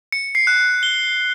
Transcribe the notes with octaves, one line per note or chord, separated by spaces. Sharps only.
C#7
C7
F#6
G7